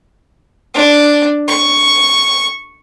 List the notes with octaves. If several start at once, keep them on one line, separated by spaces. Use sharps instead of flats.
D4
C#6